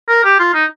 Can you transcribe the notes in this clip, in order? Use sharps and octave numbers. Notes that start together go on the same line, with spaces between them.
A#4
G4
F4
D#4